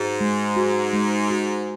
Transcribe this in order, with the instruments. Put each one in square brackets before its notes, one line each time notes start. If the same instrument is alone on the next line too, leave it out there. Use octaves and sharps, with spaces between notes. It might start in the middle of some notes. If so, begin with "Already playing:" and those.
Already playing: [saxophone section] G#2 [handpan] F#4
[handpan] G#3
F#4
G#3
F#4